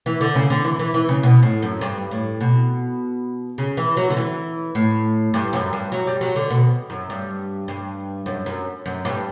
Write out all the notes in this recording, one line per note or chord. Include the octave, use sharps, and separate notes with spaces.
E3
D3
C#3
D3
E3
E3
E3
C#3
B2
A2
F#2
G2
A2
B2
C#3
E3
F#3
D3
E3
A2
G2
F#2
G2
F#3
G3
F#3
D3
B2
F#2
G2
G2
F#2
F#2
F#2
G2